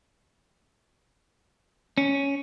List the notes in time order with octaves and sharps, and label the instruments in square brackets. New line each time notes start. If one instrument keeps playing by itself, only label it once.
[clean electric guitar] C#4